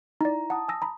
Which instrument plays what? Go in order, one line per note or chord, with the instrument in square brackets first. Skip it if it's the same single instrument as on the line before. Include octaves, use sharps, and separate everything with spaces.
[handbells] D#4 D5 [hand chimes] E4 A#5
[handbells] F#5 [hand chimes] A5 D#6
[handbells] G#5 E6 A#6
A#5 B5